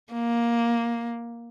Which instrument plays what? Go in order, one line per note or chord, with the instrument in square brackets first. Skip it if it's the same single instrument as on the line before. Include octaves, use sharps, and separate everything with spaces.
[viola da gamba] A#3